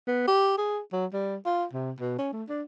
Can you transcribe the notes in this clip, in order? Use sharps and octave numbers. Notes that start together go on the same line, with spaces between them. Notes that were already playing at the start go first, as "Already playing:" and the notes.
B3
G4
G#4
F#3
G3
F4
C3
B2
C#4
A3
D4